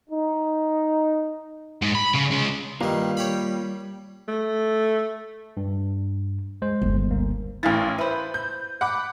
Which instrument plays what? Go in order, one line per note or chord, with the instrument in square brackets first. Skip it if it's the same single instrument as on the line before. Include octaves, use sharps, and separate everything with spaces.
[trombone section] D#4
[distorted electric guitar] G#2
B5
C#3
G#3 C#4
[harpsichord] G2 D#3 [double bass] G3 [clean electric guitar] A#3 F4 A#4
[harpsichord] C#5 G5 B5
[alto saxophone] A3
[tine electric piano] G2
G#3 C5
[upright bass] G1 D#2
[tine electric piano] C#2 A#3
[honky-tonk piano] A1 F5 A6 [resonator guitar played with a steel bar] E4 A#4
[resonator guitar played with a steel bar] B4 C5 [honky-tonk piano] E5 B5
[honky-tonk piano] G6
F#5 B5 D6